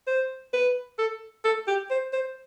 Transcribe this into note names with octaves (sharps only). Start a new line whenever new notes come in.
C5
B4
A4
A4
G4
C5
C5